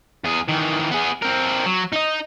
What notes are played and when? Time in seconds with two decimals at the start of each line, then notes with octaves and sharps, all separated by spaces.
0.24 E2 G#4
0.48 D#3 E3
0.91 B3 G#4
1.22 C4 A#4
1.66 F#3
1.93 D#4 D#5